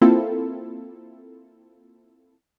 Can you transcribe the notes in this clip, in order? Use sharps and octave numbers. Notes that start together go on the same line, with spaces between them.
A#3 C4 E4 F4 A4